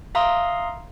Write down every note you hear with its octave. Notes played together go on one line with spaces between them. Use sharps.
E5 F5 A#5 C6 D#6